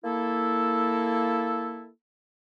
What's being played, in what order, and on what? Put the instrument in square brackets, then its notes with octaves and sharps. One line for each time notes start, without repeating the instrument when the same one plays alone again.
[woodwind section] A#3 E4 A4